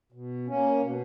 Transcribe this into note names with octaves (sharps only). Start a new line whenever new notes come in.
B2
A#3 C#4
B2